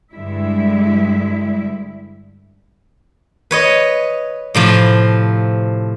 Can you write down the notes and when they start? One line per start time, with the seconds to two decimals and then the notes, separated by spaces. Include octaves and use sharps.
0.13 G2 D3 G3 G#3 E4 E5
3.51 B4 C#5 D#5
4.55 A2 C3 F3